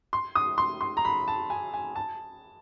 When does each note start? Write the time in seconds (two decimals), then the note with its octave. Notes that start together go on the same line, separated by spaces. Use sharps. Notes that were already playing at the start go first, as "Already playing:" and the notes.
0.13 C6
0.35 D#6
0.58 C6
0.81 C6
0.97 A#5
1.05 B5
1.28 A5
1.50 G#5
1.74 G#5
1.96 A5